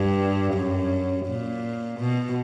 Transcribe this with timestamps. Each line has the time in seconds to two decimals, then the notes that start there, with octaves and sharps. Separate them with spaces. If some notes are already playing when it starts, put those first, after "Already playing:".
Already playing: G2
0.54 F#2
1.27 A#2
2.00 B2